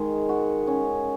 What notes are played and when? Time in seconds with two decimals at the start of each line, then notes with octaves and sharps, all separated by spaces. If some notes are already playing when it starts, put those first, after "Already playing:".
Already playing: D#3 G#3
0.29 F#4
0.67 C#4